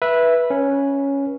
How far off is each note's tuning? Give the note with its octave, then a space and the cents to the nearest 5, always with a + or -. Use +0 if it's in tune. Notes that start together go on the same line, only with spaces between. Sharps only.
B4 -15 E5 +0
C#4 +0 B4 -30